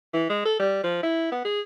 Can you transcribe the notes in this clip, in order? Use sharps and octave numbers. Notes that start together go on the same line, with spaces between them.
E3
G#3
A4
G3
F3
E4
B3
G#4